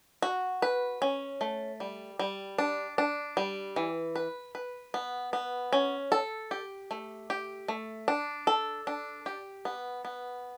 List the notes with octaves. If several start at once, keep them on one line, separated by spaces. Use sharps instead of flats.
F#4
B4
C#4
A3
G3
G3
D4
D4
G3
E3
B4
B4
B3
B3
C#4
A4
G4
A3
G4
A3
D4
A4
D4
G4
B3
B3